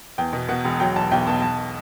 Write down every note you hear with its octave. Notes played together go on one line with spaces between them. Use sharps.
E2 G5
B2
B2 F#5
E1
F#3 G5
B1 A5
B1 G5
B2 A5
B1 A5